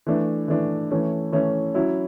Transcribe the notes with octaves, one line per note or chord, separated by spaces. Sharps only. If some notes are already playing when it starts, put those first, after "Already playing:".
E3 A3 D4
E3 A3 D4
E3 A3 C#4
E3 A3 C#4
F#3 C#4 E4